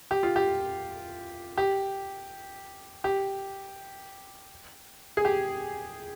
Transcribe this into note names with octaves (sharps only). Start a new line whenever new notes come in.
G4
F4
G4
G4
G4
G#4
G4